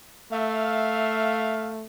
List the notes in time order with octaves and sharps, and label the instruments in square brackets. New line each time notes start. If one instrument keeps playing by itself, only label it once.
[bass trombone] A3 [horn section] E5 F5